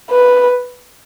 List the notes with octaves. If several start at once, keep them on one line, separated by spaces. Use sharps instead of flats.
B4